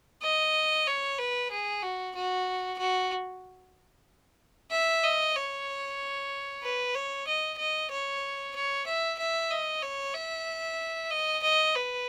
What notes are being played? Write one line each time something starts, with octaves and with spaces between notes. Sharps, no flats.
D#5
C#5
B4
G#4
F#4
F#4
F#4
E5
D#5
C#5
B4
C#5
D#5
D#5
C#5
C#5
E5
E5
D#5
C#5
E5
D#5
D#5
B4